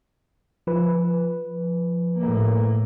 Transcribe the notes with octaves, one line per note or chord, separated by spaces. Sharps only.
F3 B4
A2 A#3